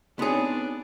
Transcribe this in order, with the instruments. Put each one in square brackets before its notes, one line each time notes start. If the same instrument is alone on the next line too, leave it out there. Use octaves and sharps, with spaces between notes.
[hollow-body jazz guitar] B3 G#4 [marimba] C4 D#4 C#5 [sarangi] D4